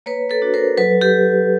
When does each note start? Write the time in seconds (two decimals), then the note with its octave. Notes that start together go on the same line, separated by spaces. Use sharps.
0.06 A#3 B4 C#5
0.30 A4 B4
0.42 D4 F#4
0.54 A#4 C5
0.78 F#3 A4 B4
1.01 G4 A4